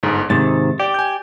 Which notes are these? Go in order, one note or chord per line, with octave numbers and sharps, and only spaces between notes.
G1 G#2 G#4
G#2 C3 D#3 A6
G4 D5
G#5 G6